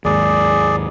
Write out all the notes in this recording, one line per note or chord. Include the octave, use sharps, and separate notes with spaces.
D#2 G#2 G#4 D5